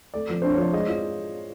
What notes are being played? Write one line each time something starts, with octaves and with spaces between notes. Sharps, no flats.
A3 D5
F3
D4 C5
C#5
F3 D5
G#3 D#5
F4